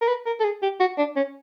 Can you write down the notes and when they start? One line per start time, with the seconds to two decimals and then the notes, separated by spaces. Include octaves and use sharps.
0.02 A#4
0.08 B4
0.26 A#4
0.40 A4
0.45 G#4
0.63 G4
0.80 F#4
0.98 D4
1.16 C#4